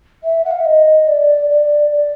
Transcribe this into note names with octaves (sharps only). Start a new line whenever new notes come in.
E5
F#5
F5
E5
D#5
D5
D5
D5